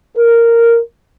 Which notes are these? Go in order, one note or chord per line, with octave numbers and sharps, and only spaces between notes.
A#4